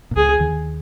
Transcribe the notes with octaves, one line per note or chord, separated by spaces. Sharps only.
A#2
C#2 C#3 G#4
D#2 D#3